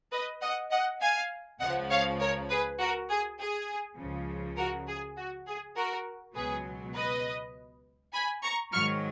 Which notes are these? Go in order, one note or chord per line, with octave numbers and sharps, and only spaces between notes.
B4 D#5
D#5 F#5
D#5 F#5
F5 G#5
C#2 C#3 F3 D#5 F#5
C#5 F5
A#4 C#5
G#4 B4
F#4 A#4
G#4
G#4
C#2 C#3 F3
F#4 A#4
G#4
F#4
G#4
F#4 A#4
C#2 B2 F#3 G#4 B4
B4 D#5
G#5 B5
A#5 C#6
G#2 D#3 F#3 C#6 F6